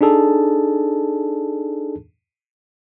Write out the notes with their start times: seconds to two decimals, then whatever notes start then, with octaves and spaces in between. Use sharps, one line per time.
0.01 D4 D#4 G#4 A4 A5